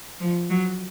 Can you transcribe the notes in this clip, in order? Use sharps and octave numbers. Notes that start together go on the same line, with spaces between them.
F3
F#3